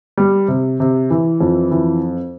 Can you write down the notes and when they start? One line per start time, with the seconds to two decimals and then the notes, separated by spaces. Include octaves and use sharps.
0.17 G3
0.48 C3
0.80 C3
1.10 E3
1.40 F2
1.71 E3